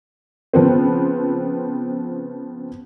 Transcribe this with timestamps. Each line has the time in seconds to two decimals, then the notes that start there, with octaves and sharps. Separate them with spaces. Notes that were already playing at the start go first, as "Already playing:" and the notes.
0.53 C#3 F3 B3 C4